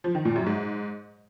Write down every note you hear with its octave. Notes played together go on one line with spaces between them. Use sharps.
F3
D#3
A#2
F#2
G#2